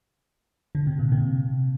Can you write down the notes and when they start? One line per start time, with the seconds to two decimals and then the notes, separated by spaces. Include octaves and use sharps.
0.75 D3
0.87 C3
0.99 A#2
1.12 C3